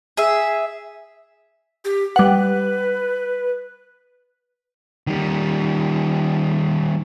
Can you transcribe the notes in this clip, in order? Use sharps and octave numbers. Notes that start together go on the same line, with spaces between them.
G#4 E5
G4
G3 B4 F#5
D#3 G3